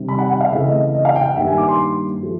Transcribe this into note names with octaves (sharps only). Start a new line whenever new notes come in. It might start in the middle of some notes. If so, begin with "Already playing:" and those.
Already playing: C3 D#3 G3
B5
F#5
F#5
F5
C#3 E3 A3 C4 E5
D#5
D#5
F5
G5
F#5
G2 D#3 G3 A#3 E5
G#5
D6
C6
F3 A3